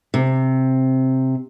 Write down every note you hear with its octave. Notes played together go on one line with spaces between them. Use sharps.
C3